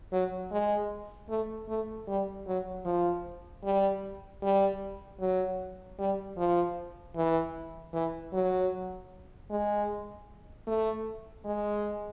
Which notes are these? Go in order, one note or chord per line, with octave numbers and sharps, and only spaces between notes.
F#3
G#3
A3
A3
G3
F#3
F3
G3
G3
F#3
G3
F3
E3
E3
F#3
G#3
A3
G#3